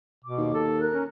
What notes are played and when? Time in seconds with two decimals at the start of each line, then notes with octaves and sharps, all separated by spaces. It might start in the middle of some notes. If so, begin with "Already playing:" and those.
0.24 B2 D6
0.38 D#2
0.55 A4
0.79 A#4 F#6
0.94 C#4